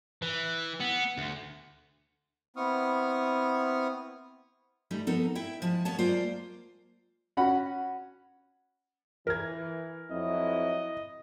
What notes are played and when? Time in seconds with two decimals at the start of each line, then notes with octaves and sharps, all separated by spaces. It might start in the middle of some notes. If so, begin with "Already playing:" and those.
0.22 E3
0.80 B3
1.17 D2
2.56 B3 C4 E4 C#6 D#6 F6
4.91 E3 G3 A3 D#4
5.07 F3 B3 D#4 A4 A#4
5.35 E4 E5 G5
5.62 F3 G#3 A5
5.85 D#3 B3 C#5 A5
5.98 F#3 G#3 A#3 F4 C5 D5
7.37 C#4 F#4 F#5 B5
9.27 E3 A#4 G#6
10.11 F2 F#3 E4 D#5